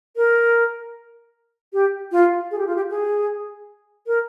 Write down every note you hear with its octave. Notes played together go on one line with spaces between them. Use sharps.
A#4
G4
F4
G#4
G4
F4
G4
G#4
A#4